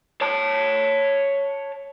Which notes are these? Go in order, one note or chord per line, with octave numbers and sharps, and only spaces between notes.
C#5 A5